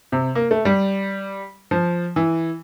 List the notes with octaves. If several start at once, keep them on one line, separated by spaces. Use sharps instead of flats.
C3
A#3
A3
G3
F3
E3